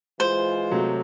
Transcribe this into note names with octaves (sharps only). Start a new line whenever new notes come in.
E3 G#3 F4 C5
C3 F#3 A3